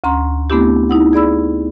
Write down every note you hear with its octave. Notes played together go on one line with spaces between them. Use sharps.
D2 C#4 A#5 C6
A3 B3 C4 D4 E4 G4
D#4 E4 F#5
G#4 D5 B5 E6